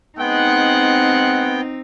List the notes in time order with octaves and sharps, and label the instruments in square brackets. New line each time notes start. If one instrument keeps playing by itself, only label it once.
[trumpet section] G#3 F#5 [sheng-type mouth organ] B3 G5 [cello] C4 D#4